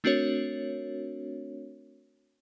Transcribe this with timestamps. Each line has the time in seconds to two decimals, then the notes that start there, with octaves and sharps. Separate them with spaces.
0.04 A3 C4 D4 F#4 A#4 C#5